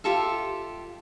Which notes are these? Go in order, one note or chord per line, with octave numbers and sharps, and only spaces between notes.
F4 G4 A4 E5